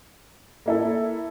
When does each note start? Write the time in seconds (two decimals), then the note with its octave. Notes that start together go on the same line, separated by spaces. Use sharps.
0.66 A#3 E4 A4